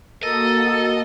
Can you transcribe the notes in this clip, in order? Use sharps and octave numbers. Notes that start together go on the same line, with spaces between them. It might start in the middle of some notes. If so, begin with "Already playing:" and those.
A#3 F#4 A4 A#4 D#5 A5